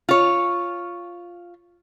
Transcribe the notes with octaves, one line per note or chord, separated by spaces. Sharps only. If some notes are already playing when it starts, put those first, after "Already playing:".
F4 C#5